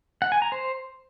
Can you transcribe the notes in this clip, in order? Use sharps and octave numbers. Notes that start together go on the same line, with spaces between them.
F#5
G#5
A#5
C5